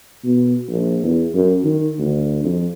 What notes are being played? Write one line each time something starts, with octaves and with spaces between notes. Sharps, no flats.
B2
A#1
E2
F#2
D#3
D2
F2